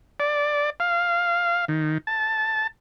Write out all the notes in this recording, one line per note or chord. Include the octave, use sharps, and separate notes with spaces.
D5
F5
D#3
A5